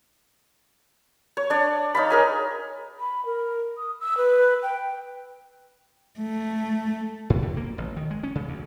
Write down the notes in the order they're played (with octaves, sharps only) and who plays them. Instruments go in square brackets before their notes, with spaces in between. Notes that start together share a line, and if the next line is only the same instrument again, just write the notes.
[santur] C#5
D4 D5
D#4 C#5 F5 B5
G#4 A#4 G#5
[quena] B5
A#4
D#6
E6
B4
G5
[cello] A3
[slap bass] G#2
D3
A#3
A1
D#3
G#3
C#4
C#3
D2